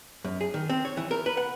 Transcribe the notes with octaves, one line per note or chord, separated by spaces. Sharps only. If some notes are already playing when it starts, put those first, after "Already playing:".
F#2
G#4
D#3
C4
C#5
E3
A#4
B4
F#5